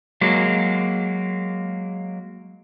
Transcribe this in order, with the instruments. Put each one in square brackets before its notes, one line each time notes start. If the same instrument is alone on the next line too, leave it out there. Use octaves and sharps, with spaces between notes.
[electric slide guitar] F#3 G#3 A#3